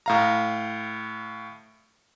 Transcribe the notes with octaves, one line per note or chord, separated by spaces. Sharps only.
A2 F5 A#5